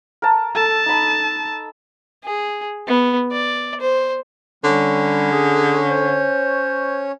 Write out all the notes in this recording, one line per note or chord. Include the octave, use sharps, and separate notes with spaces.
A#4 A5
A4 A5
D#4 B5
G#4
B3
D5
C5
D3 G3 C#4 C#5
G#4
C5